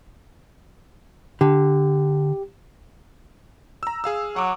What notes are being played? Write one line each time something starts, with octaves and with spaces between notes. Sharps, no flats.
D3 G4
A#5 E6
G#4 F5 E6
F#3 F#5 D6